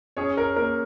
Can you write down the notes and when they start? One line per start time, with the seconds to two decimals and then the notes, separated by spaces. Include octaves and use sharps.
0.17 C#4 G#4 C#5
0.37 A#4
0.56 A#3 A#4